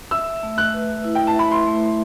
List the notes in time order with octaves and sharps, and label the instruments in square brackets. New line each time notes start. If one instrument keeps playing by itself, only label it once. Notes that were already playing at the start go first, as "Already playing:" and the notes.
[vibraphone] E5 [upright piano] E6
[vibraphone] A3
[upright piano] F#6
[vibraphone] B4
E4
[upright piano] G5
A5
[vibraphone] E5 [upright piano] B5
[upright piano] C6
[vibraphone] A3